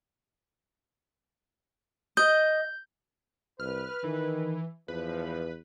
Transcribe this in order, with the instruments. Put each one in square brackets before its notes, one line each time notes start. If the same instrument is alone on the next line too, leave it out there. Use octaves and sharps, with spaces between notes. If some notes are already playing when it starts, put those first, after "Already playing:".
[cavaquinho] D#5 [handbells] G6
[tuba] C2 [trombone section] B4 [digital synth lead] F6
[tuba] D#3 [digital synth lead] E3
[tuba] E2 [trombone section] G2 F3 [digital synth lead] B4